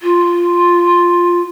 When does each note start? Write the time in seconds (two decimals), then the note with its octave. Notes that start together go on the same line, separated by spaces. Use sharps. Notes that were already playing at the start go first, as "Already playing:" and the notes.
0.01 F4